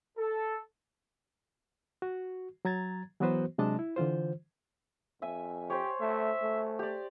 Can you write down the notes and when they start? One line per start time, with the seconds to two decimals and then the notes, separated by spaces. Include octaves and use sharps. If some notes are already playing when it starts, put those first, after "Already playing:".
0.18 A4
2.02 F#4
2.65 F#3 A#5 G#6 A6
3.20 E3 F#3 B3 F#4 B4 C5
3.58 C3 F#3 G#3 D4 D#5 A5
3.79 E4
3.96 D3 E3 F4 C5
5.22 F2 E5 G#5
5.70 G4 C5 C#5
6.00 A3 E5
6.42 A3
6.79 G4 D5